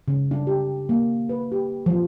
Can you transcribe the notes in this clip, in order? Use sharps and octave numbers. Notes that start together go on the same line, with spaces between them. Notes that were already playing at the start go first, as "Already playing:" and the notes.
C#3
D4
G4
A#3
B4
G4
F3